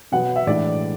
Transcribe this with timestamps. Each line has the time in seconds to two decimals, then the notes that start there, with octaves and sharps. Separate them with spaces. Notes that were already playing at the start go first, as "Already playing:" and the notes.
0.12 B2 F#3 B3 F#5
0.36 E5
0.47 A2 E3 G#3 D4 D5